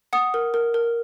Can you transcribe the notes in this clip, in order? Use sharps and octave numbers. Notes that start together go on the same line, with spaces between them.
F#5 D#6
A#4
A#4
A#4